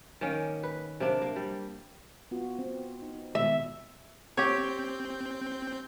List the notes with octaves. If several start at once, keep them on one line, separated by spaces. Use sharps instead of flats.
D#3 A#3 C#4
B4
C3 A#3 D4
A#3
G3
B3 F4 F#4
C4
D#4
B2 D#3 G#3 E5
C4 G4 C#5 G6